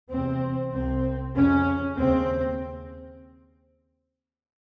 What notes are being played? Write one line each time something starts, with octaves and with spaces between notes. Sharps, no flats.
E2 C3 C4
C2 C3 C4
F2 C#3 C#4
D#2 C#3 C4